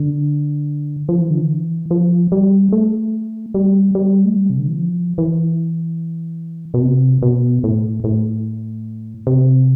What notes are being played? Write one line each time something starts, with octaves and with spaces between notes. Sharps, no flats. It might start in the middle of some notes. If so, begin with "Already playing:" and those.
Already playing: D3
F3
E3
D3
E3
F3
G3
A3
G3
G3
A3
G3
C3
D3
E3
F3
E3
B2
C3
B2
A2
A2
C3